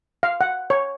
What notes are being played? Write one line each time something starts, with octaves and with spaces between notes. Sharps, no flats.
F5
F#5
C#5